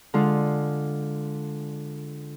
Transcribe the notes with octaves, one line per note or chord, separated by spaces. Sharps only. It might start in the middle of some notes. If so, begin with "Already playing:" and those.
D3 G#3 F4